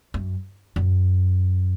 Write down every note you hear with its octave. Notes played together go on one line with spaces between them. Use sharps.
F#2
F#2